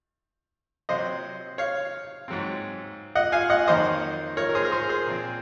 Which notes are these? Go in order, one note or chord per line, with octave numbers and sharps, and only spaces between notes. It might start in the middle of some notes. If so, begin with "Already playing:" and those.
C3 F#3 C4 C5 D#5
C#5 F5
G#2 F#3 C4
D#5 F#5
F5 G#5
D#5 F#5
F2 D#3 F#3 A#3 C5 D#5
A#4 C#5
A#4
G#4 C5
A#4
G#4 C5
G#4 C5
A#2 F3 C4